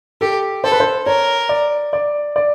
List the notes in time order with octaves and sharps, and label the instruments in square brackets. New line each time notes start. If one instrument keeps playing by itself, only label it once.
[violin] G4 [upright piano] A4
[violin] A4 [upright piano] C5
[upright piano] B4
C5
[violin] A#4 [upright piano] C#5
[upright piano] D5
D5
D5